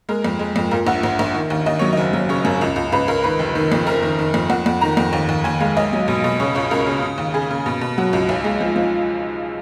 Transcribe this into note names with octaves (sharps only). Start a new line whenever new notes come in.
G#3 A#4
F2
G#3
F2
A#2 A#4
A#1 F#5
A#1
A#1
D#3
D#2
D#2 D#5
F#3 C#5
F#1 D#5
F#3
C#3 C#5
F#2
C#2
C#2
C#2 B4
C#2 A#4
D#3 B4
F1
D#3
F2
F#1 A#4
D#3
D#3
F2
F2 F#5
F2
D#3 A#5
F2
D#2
D#2
D#2 G#5
G#3 F5
B1 D#5
F#3
B2
B2
C#3 C#5
C#2 C#5
C#2 A#4
C#3
C#3
D#2
C#3 G#4
C#3
B2
B2
F#3 F#4
C#2
B1
G#3
F3
F3